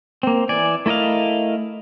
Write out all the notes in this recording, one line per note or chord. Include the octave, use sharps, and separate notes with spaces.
A#3 C4
E3 D5 G#5
A3 E4 A#4 D#5 F5